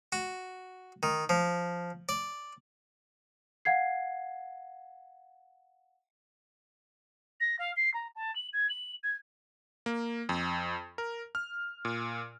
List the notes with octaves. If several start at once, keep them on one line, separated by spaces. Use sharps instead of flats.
F#4
D#3
F3
D5
F5 F#5 G#6 C7
A#6
F5
C7
A#5
A5
F#7
G#6
F#7
G#6
A#3
F2
A#4
F6
A#2